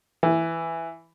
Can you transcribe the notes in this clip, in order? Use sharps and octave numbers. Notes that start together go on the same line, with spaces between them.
E3